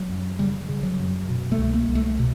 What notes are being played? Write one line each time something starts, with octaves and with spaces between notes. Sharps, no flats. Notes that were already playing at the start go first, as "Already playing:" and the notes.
Already playing: F#3
F#2
C#3 G3
C#3
F#3
F#2
B2
A3
C2
A#3
C2
A3
B2